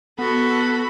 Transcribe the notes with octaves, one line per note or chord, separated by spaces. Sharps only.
B3 F#4 A4 B5